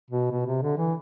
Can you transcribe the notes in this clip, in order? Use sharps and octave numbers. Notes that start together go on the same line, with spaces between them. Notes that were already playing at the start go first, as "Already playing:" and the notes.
B2
B2
C3
D3
E3